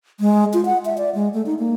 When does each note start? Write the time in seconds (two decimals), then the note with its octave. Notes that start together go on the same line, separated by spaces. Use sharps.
0.20 G#3
0.54 F4
0.65 F#5
0.85 E5
0.98 D5
1.15 G#3
1.34 A3
1.46 D#4
1.59 A#3